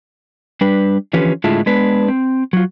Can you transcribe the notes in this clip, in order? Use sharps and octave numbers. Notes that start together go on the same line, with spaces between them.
G3 D4 B4
D3 E3 F3 C#4 G4 B4
A2 D3 G#3 E4 F4 A5
G#3 B3 D4 B4
C4
F#3 F4